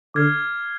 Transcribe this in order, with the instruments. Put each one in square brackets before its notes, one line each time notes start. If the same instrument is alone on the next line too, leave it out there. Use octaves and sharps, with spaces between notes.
[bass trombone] D3 [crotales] D6 F6 G#6 C7